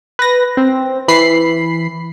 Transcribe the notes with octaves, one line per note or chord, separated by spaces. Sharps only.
B4 A#6
C4
E3 B5 C7